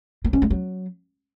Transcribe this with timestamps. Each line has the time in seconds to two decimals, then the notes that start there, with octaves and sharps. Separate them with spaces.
0.24 A#3
0.33 C#4
0.42 G#3
0.50 F#3